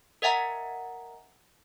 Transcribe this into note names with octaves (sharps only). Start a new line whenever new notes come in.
A#4 D#5 E5 F#5 G#5 A#5